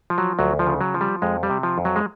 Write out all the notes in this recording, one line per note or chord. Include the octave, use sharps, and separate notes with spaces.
F3
F#3
D2 F#3
F3
C#3
F#3
F3
G3
F2 G#3
G3
C3
F3
F2
F#3
G#3